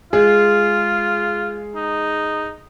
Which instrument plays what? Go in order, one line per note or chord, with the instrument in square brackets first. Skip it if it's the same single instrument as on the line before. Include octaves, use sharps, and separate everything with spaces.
[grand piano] G#3 G#4 [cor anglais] F4
[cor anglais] D#4